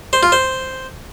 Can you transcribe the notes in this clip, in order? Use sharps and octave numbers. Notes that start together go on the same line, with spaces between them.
C5
F4
C5